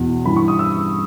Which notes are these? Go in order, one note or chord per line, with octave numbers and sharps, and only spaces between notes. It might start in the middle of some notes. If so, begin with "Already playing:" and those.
Already playing: E2 B2
G2 E3 B5
C#6
D#6
E6